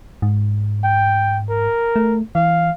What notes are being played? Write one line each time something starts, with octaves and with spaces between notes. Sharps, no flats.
G#2
G5
A#4
A3
E3 F5